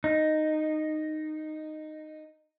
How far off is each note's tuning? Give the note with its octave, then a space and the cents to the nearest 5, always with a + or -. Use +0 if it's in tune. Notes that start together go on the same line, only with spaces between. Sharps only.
D#4 -10